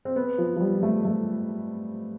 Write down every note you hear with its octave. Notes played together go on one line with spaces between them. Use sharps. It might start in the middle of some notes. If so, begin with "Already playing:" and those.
C4
B3
F3
F3
G3
A3
A3